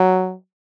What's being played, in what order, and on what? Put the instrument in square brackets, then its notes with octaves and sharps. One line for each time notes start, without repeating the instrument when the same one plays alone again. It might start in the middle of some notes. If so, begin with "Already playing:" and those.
Already playing: [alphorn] F#3